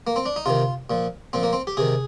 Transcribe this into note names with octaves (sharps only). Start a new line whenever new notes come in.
A#3
C4
D4
D#4
C3 D#3 F4
A#2 F3
A#2 F3 C4
A#3
C4
G4
C3 D#3 G#4